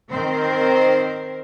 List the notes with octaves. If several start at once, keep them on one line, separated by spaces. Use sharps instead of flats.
D#3 C4 A#4 C5